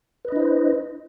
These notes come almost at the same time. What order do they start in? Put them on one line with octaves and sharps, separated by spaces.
B4 D#5 D4 E4 C5